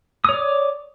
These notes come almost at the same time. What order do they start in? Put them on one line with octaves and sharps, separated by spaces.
D#6 C#5 D5